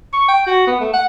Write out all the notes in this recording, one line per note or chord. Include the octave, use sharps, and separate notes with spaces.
C#6
G5
F#4
B3
A3
F#5